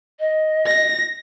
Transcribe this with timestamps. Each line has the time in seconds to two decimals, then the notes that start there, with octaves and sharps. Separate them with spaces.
0.20 D#5
0.67 A#6